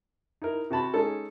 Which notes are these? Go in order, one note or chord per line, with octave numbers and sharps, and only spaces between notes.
D#4 E4 A#4
C3 F#4 A5 B5
G#3 C#4 D#4 A4